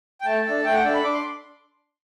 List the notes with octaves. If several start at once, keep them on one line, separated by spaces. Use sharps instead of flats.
G5
A3 A5
D4 A4
A3 G5
F#5
D4 A4 A5
B5
D4 D6
C6